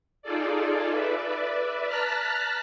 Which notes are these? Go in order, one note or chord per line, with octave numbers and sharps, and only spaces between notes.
D#4 F4 G#4 A4 D5
B4 D5 E5
A5 A#5 F6 F#6 A6 B6